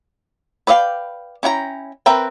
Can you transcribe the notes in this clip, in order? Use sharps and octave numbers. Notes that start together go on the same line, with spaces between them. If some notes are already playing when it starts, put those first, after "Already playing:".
B4 D5 D#5 F5 G5
C#4 E4 G5 A#5
C4 A#4 B4 E5 G5